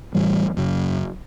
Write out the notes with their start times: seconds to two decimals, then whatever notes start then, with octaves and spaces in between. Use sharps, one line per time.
0.14 A2 E3 G3
0.57 F#2 C#3